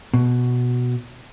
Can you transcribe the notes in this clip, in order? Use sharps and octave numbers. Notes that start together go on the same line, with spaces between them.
B2